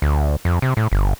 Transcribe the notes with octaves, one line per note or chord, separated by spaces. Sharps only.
D2
F2
C3
A2
G1